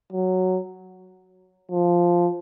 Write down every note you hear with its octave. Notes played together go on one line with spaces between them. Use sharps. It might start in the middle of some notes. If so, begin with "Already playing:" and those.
F#3
F3